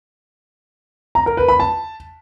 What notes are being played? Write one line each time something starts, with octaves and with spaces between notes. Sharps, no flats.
A#5
A#4
B4
B5
A5